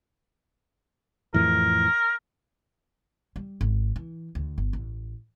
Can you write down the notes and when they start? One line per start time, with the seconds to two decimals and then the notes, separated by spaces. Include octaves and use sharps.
1.34 F2 A2 E3 A#4
3.36 G3
3.61 G#1
3.96 E3
4.35 D2
4.58 G1
4.73 A1